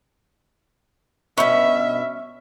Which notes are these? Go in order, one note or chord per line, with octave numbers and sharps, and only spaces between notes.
G2 B2 C#4 E5 B5